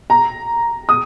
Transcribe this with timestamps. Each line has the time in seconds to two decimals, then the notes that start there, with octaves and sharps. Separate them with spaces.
0.10 A#5
0.89 D#6